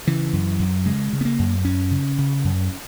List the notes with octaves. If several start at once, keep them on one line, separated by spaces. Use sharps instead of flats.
C#3 E3
F#2
F#2
C#3 G#3
C#3
B3
A#3
F#2
F#2 C#4
C#3
C#3
F#2